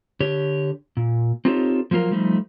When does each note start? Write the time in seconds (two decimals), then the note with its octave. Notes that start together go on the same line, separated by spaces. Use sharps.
0.20 D3 G4 C#5
0.97 A#2
1.45 C4 D#4 F4 G4 A4 C#5
1.91 F3 F#3 A#3 F4 A#4
2.11 F3 G3 A3 D#4